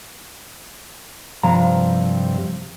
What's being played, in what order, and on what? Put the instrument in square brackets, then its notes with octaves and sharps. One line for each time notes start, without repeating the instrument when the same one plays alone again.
[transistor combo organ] G2 C3 [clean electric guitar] F3 F5 A#5